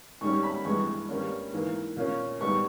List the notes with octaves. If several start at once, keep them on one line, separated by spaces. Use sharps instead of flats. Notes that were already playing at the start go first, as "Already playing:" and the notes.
G#2 D#3 G3 C#4 C#6
B5
G2 E3 G#3 C#6
G2 G3 A#3 C#4
G#2 E3 A#3
A#2 A#3 C#4
G#2 G3 B3 C#6